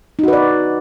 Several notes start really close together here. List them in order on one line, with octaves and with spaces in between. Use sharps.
D#4 F#4 B4 D5